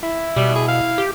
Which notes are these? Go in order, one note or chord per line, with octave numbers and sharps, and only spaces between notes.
E4
B2 G3
G#4
F5
G4